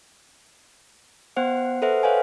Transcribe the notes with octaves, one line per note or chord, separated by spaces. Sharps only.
B3 C5 F#5 G5
A4 B4 C5 E5 F#5
B4 C#5 F5 F#5 G#5